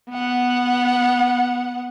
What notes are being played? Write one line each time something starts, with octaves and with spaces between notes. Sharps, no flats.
B3 F#5